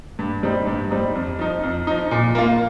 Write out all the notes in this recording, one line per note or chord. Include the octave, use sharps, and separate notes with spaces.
G2
G3 C4 D#4
G2
G3 C4 D#4
F2
F3 D#4
F2
F3 D#4
A#2
A#3 F4